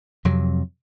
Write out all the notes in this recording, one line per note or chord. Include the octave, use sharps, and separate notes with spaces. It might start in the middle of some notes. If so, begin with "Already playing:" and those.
F2 C3 F#3